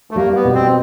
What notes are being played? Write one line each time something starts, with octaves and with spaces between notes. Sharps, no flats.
A3
G3 A#3
B3
B2
C4